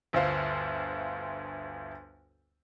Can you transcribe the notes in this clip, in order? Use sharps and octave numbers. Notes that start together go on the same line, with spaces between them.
G1 D2 F4 C5 F5